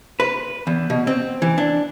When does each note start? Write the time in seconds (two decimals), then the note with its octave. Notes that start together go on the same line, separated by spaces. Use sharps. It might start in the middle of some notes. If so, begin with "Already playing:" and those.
0.20 B4
0.67 E2
0.90 B2
1.07 C4
1.42 E3
1.58 D4